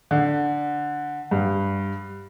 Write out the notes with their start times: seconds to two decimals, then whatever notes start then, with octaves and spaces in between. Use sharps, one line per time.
0.11 D3
1.31 G2